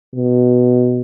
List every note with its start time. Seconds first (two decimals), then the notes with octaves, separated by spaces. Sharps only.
0.15 B2